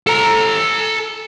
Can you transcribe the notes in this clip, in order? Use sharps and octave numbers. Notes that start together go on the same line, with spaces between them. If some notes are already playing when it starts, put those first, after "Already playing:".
A4 A#5